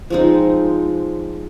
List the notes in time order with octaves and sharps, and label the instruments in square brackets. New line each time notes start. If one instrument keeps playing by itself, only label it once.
[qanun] F3 G#3 C4 D#4